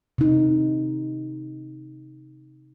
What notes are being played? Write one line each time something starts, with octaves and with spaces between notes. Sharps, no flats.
C3 D#4